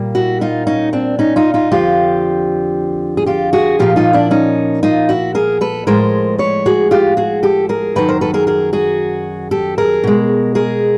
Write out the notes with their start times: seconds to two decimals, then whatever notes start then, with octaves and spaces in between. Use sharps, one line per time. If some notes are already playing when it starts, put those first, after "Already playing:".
Already playing: A#2 G3 A#3
0.15 E4 F#4
0.41 D#4 F4
0.67 C#4 D#4
0.93 C4 D4
1.19 C#4 D#4
1.36 D#4 F4
1.54 D#4 F4
1.71 F2 D3 F3 F4 G4
3.17 G#4
3.26 F4 G4
3.53 F#4 G#4
3.79 A#2 F3 A#3 F4 G4
3.96 D#4 F4
4.13 D4 E4
4.31 C#4 D#4
4.83 D#4 F4
5.09 E4 F#4
5.35 G#4 A#4
5.61 A4 B4
5.87 A2 F3 G#3 A#4 C5
6.38 B4 C#5
6.66 F#4 G#4
6.91 F4 G4
7.17 F#4 G#4
7.43 G4 A4
7.69 G#4 A#4
7.96 F#2 D#3 F#3 A4 B4
8.08 A#4 C5
8.21 A4 B4
8.34 G#4 A#4
8.47 G#4 A#4
8.73 F#4 G#4
9.51 G4 A4
9.78 G#4 A#4
10.04 B2 G#3
10.55 G#4 A#4